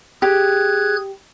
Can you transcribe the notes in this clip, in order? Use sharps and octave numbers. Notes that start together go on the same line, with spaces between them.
G4 G#4 F#6 G#6